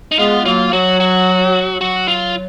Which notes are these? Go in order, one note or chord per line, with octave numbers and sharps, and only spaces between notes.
D#4
G#3 B3 F4
G#3
F#3 A#3 F4
F#3 F#4
F#4
F#3 F#4
F4